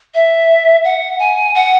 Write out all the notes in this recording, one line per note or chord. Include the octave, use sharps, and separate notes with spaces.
E5
F#5
G#5
F#5